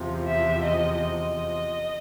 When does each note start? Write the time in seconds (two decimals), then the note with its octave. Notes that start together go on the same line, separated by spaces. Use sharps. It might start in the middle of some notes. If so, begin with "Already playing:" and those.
Already playing: E2 C3 F3
0.27 E5
0.64 D#5
1.01 D#5